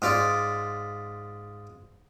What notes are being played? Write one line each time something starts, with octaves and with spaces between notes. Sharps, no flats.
G#2 F4 D5